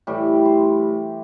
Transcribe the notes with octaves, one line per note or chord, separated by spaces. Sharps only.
A2 E3 G3 G4
C5